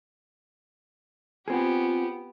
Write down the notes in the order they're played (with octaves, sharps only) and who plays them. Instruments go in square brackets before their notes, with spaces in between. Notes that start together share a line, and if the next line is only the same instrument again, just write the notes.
[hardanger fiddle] B3 G4 [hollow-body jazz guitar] C4 G#4 [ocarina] F4